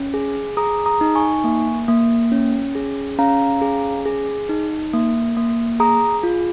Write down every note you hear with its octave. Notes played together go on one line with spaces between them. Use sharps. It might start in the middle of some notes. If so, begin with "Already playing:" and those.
Already playing: C#4
G#4
G#4 A#5 D#6
A#5 D#6
D#4
G#5 C#6
A#3
A#3
C#4
G#4
C#4 F5 A#5
G#4
G#4
D#4
A#3
A#3
G#4 A#5 D#6
F4